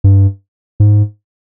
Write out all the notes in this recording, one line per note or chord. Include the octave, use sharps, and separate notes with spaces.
G2
G#2